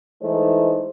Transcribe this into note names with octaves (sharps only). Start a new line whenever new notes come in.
E3 G#3 A3 D#4 C5